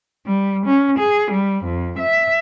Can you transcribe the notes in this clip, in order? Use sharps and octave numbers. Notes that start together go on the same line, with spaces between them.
G3
C#4
G#4
G3
F2
E5